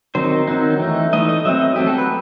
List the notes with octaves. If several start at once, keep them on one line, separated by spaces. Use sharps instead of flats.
D#3 F#3 C4 D#4 C5
D#3 F#3 C4 D#4
E3 A3 D#4
E3 A3 D#4 D#5
D#5
F#3 A3 C4 E5
D#5
F#3 A3 C4 G4
A4
B4